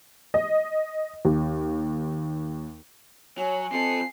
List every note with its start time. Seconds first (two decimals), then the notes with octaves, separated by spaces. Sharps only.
0.34 D#5
1.25 D#2
3.38 F#3 C#5 G#5
3.72 F3 C4 A4 C7